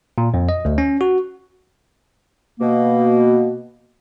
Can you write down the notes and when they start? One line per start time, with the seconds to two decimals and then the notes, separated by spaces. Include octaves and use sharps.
0.18 A#2
0.34 F2
0.49 D#5
0.65 D2
0.78 C#4
1.01 F#4
2.60 B2 A#3